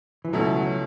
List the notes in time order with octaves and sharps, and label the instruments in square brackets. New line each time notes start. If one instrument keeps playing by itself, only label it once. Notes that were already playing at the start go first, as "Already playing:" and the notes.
[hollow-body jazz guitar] E3
[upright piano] C#2 B2 A3 C#4 E4 [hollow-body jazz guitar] F#3
[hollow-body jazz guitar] F#3